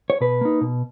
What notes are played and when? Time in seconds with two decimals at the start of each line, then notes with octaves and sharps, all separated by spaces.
0.10 C#5
0.21 B2 B4
0.41 A#3 D#4
0.61 B2